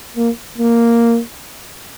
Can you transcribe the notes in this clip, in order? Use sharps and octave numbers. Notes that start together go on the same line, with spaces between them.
A#3
A#3